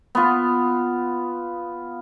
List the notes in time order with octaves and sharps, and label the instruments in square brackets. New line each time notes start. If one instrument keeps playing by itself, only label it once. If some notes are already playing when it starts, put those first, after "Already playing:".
[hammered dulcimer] B3 F4